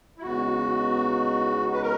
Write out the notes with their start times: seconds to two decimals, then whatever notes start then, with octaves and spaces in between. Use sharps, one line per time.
0.18 E4
0.22 E2 C#3 G#3 B3 D#4 F#4
1.73 B4
1.82 A#4